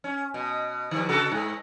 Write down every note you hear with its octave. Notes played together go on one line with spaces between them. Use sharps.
C#4
B2
D#3 F3 G3
C#3 F#4 A4
G#2